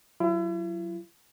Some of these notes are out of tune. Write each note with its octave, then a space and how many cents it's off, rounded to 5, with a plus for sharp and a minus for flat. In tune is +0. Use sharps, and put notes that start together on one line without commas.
F#3 +0 E4 +40